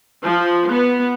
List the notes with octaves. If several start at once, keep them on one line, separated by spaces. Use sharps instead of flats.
F3
B3